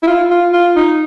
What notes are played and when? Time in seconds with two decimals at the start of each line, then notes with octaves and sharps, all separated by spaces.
0.03 E4
0.07 F4
0.30 F4
0.53 F4
0.76 D#4